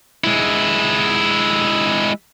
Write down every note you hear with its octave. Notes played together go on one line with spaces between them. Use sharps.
G#3 E4